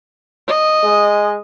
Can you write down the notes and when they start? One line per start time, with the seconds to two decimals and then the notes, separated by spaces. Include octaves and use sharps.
0.48 D#5
0.84 G#3